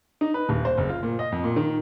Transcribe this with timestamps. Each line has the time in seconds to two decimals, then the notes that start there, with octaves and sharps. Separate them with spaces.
0.21 D#4
0.34 B4
0.49 D#1
0.65 C5
0.78 F#1
0.89 F4
1.03 A#2
1.19 D#5
1.32 F2
1.44 A#2
1.56 D#3